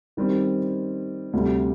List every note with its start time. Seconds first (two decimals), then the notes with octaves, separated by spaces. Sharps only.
0.17 D#3 G3 C4
1.33 D2 C3 G3